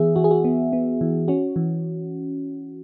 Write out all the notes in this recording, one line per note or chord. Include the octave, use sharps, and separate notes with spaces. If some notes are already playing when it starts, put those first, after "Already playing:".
Already playing: E3 B3 G#4 E5
E3 F#4
G#4
F#4
B3
B3
E3
C#4 F#4
E3